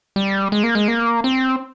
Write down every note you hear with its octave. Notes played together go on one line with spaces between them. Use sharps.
G3
G#3
A#3
G#3
A#3
C4